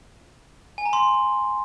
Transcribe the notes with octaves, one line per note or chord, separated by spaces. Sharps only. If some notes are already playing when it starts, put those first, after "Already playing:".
G#5
A#5
C6